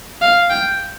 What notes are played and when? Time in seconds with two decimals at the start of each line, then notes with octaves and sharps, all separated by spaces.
0.21 F5
0.50 G5